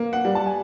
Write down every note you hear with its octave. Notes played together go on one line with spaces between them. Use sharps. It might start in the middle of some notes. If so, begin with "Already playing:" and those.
Already playing: A#3
F#5
G3
A5
G#5